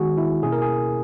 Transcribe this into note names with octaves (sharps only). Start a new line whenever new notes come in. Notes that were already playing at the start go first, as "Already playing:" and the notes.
Already playing: D#3 G#3 B3 F#4 G#4
E4
B2 A#3 C#4 E4 G#4
A#4
G#4